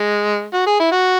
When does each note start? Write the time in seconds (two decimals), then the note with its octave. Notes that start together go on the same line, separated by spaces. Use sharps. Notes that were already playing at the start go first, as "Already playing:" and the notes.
Already playing: G#3
0.54 F#4
0.67 G#4
0.79 E4
0.92 F#4